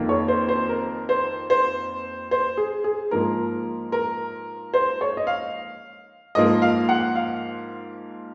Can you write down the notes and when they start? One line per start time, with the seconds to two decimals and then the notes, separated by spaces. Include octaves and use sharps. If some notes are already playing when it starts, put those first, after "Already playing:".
Already playing: F2 D#3 A#3
0.09 C#5
0.28 C5
0.49 C5
0.69 A#4
1.09 C5
1.50 C5
2.31 C5
2.57 G#4
2.84 G#4
3.11 G#2 F3 A#3 A#4
3.92 A#4
4.74 C5
5.01 C#5
5.17 D#5
5.27 F5
6.35 G#2 F3 A#3 D#5
6.62 F5
6.89 F#5
7.16 F5